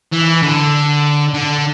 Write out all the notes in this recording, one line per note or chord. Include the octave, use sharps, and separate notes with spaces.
E3
D3
D3